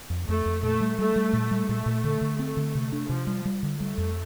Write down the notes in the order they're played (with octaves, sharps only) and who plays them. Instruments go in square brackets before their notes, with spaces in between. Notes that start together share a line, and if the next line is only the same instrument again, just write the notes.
[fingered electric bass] F2
[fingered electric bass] F2 [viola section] A3
[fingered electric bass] F2
[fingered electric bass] A#2 [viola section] A3
[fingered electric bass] G3
[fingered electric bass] G3 [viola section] A3
[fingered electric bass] G3
A#2
G3
[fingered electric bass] A#2 [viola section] A3
[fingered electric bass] A#2
D3
D3
[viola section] A3 [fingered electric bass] C4
[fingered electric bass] D3
C3
D4
[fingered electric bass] C3 [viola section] F3
[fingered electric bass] G3
G3
D3
[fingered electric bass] G3 [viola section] A3
[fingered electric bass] F2